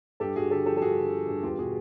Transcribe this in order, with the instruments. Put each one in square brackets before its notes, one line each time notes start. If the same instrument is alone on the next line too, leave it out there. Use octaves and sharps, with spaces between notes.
[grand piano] G2 G4 A4
G2 F#4 G#4
D3 G4 A4
F3 G4 A4
A4
G2 F#4 G#4
D3
F3
G2
E2 F4 G4
B2 F#4 G#4